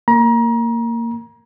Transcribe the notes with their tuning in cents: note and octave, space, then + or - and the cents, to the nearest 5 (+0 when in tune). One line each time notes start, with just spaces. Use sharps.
A#3 -15 A#5 +30